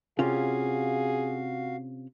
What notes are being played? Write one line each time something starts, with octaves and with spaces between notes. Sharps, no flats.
C3 C#4 F4 F#4 G#4 F5